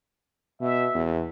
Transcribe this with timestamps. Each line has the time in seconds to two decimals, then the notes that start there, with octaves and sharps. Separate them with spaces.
0.61 B2 E5
0.95 E2